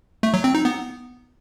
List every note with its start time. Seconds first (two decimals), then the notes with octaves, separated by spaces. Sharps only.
0.23 A3
0.34 F#3
0.44 C4
0.55 D#4
0.65 B3